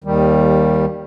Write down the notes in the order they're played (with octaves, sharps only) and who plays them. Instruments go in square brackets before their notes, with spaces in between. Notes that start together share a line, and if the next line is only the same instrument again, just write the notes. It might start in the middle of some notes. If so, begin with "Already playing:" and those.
[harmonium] D#2 D#3 G3